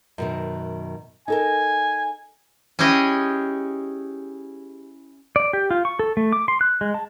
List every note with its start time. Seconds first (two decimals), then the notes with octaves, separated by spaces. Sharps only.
0.18 F#2 B2 D#3
1.28 D#4 A4 A#4 G#5
2.79 C#4 E4 G4 G#4 D#5
5.36 D5
5.53 G4
5.71 F4
5.85 C#6
5.99 A4
6.17 A3
6.32 D6
6.48 C6
6.61 F#6
6.81 G#3
6.94 A5